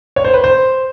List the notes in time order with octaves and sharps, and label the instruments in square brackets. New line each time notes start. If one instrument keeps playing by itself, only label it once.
[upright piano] C#5
C5
B4
C5